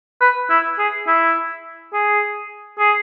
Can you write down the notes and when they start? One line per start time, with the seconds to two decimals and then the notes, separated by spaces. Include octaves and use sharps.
0.21 B4
0.50 E4
0.79 G#4
1.07 E4
1.93 G#4
2.79 G#4